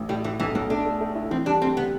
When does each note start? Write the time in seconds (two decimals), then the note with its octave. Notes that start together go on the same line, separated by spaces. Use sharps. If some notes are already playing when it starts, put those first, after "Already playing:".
Already playing: A1
0.09 A2 G3
0.24 A2 E3
0.40 B1 E3
0.55 B1 E3
0.70 A3 D4
0.86 A3
1.01 A3
1.15 E4
1.31 E3 C4
1.46 G3 D4
1.62 D2 C4
1.77 C3 B3